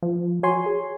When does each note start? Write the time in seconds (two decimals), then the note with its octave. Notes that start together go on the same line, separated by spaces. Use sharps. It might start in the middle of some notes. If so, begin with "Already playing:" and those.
0.02 F3
0.43 F#4 C#5 G#5 C6
0.66 G#4